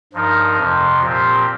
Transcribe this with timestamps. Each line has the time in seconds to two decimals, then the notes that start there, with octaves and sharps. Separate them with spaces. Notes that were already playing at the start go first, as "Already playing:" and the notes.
0.13 G2 F3 D#4 A#4
0.57 F2 C3 F3
1.02 A#2 F3 C4 G4